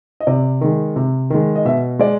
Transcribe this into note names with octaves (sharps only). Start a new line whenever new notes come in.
D#5
C3 D5
D#3 G#3
C3
D#3 G#3
D#5
B2 E5
G#3 D5